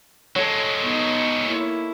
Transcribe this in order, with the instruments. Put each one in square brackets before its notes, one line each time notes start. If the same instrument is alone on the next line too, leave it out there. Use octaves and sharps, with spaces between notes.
[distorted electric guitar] F#3 G#3 [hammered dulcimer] A4 C#5
[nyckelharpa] B3 D#4
A#3 E4